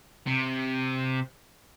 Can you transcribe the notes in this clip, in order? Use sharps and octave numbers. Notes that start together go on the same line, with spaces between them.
C3